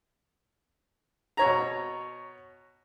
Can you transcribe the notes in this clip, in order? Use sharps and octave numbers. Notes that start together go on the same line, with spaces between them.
B2 C#5 A#5